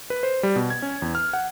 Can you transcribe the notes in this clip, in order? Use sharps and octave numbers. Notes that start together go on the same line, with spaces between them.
B4
C5
G3
B2
G#6
C#4
E2
F6
F#5